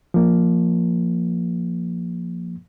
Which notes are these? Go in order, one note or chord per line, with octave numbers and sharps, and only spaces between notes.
F3 A#3